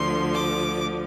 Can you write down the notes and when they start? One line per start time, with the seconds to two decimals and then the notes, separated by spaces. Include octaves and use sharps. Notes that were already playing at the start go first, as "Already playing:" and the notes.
Already playing: D2 D3 F3 C6
0.34 D6